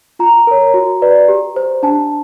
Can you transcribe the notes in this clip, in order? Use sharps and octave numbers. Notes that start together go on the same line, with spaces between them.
F4 A#5
A#4 C#5
F#4
B4 D5
G4
C5
D4 A5